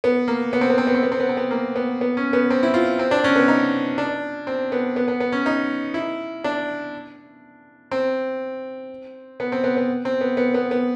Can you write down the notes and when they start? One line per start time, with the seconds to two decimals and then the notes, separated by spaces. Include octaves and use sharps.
0.04 B3
0.28 A#3
0.53 B3
0.61 C4
0.70 B3
0.78 C4
0.87 B3
0.95 C4
1.03 B3
1.12 C4
1.20 B3
1.29 C4
1.37 B3
1.51 A#3
1.76 B3
2.01 B3
2.17 C#4
2.33 B3
2.50 C4
2.63 E4
2.74 F4
2.99 C4
3.11 D4
3.24 C#4
3.36 B3
3.48 D#4
3.98 D4
4.47 C4
4.72 B3
4.96 B3
5.08 B3
5.20 B3
5.32 C#4
5.46 D#4
5.94 E4
6.44 D4
7.91 C4
9.40 B3
9.52 C4
9.64 B3
9.77 B3
10.05 C4
10.21 B3
10.37 B3
10.54 B3
10.71 B3